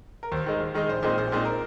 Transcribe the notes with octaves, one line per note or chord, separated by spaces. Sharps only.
A#4
D#2 C5
D#3 G#3 D#4
D#2
D#3 G#3 D#4
A#1 C5
A#2 G#3 C4 D#4
A#1 C5
A#2 G#3 C4 D#4
A#4